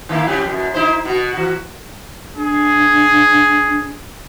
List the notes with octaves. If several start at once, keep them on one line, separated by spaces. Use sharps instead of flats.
D#3 A#3 E4
F3 C#4 G4
F#2 B2
D#4 E4 C5
B2 F#4
E3 F#4
D4 G#4